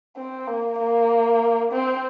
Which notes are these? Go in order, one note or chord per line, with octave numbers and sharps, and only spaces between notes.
C4
A#3
A#3
C4